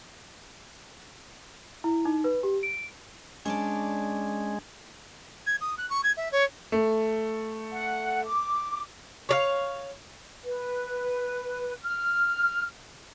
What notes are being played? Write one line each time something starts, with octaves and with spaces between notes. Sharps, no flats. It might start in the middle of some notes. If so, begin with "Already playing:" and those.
E4
D#4
B4
G4
D7
G#3 C#4 D4 D5
G#6
D#6
F#6
C#6
G#6
E5
C#5
A3
F#5
D6
C#5 D5 F5
B4
F6